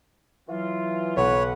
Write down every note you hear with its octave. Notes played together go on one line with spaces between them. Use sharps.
E3 F#3 F4
B1 B3 B4 C#5 F#5